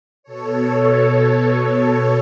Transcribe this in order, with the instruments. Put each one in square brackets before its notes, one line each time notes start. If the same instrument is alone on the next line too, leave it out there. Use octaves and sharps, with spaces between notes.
[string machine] B2 A4 C#5